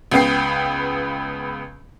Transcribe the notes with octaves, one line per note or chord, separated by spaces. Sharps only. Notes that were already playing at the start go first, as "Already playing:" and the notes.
C#2 C#3 B3 G5 C7